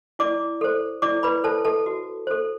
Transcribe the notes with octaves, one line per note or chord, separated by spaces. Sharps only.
E4 D5 D6
A4 C5
E4 D5 D6
B4 B5
A4 C5 A5
A4 A5
F#4
A4 C5